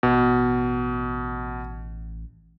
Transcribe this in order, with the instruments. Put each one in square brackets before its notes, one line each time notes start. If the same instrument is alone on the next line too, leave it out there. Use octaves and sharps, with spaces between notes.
[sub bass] A1 [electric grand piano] B2